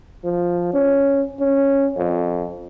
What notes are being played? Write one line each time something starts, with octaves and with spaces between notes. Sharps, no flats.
F3
C#4
C#4
F2